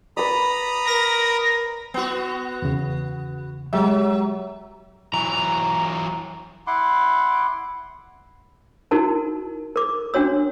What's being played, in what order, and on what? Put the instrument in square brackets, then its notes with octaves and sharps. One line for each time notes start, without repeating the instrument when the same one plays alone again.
[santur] B4 D5 [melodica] A#5 B5 D#6
[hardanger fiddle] A#4 [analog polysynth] A#6
[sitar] B3 F#4
[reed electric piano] E2 C#3
[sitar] F#3 [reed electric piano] G#3 G4 E5
[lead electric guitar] E3 F#3 [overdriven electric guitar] A#5
[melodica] E4 F#5 C6 D6
[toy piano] D#4 E4 F#4 A#4 A5
A#4 D6
C#4 D4 F#4 C#5 E6